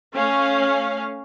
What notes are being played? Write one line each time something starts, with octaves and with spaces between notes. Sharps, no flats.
A3 C#4 F5